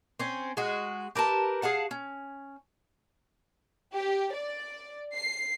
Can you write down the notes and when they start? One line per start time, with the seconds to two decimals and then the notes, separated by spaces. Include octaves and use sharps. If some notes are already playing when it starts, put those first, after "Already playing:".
0.19 C4 C#4
0.57 G#3 F#4
1.15 G4 A#4 B4 A5
1.62 G#4 F5 F#5 A5
1.91 C#4
3.95 G4
4.35 D5
5.15 C7